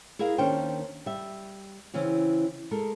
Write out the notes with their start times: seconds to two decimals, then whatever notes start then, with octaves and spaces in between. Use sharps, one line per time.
0.19 E4 G#4 A#4 D#5 F5
0.38 D#2 D#3 C#4 D4 C5 G5
1.06 G3 E5
1.94 C#3 E3 C4 C#4
2.71 G#3 A4 A#4